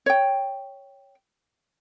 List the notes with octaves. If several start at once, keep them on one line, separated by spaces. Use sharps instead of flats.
C#5 G5